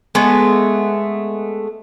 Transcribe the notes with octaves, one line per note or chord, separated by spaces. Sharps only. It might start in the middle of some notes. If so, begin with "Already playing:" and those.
G#3 A3 B3